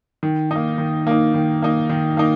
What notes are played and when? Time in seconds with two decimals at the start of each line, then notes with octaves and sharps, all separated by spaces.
0.23 D#3
0.51 A#3 D#4
0.78 D#3
1.07 A#3 D#4
1.34 D#3
1.62 A#3 D#4
1.89 D#3
2.17 A#3 D#4